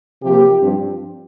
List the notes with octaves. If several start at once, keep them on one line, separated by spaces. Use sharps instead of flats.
C3 F3 A#3 G4
G2 F3 C4